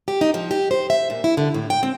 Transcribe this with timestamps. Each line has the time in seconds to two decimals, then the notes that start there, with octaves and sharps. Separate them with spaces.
0.08 G4
0.21 D#4
0.34 F3
0.51 G4
0.71 C5
0.90 E5
1.10 A#2
1.24 E4
1.37 D3
1.54 A2
1.70 G5
1.83 C4